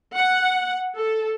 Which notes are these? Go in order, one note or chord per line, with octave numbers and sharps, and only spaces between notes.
F#5
A4